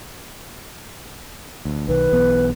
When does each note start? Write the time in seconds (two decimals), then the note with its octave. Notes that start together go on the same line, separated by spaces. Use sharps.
1.65 D2
1.88 B1 D#3 B4
2.12 B1 E3 B3